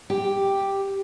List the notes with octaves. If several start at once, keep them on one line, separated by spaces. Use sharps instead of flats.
G4